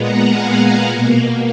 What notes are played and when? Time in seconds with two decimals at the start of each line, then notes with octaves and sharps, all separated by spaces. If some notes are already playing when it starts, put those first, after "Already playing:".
Already playing: A#2 G#3 B3 F#5 A#5
0.20 F5 G#5
0.82 B2 A#3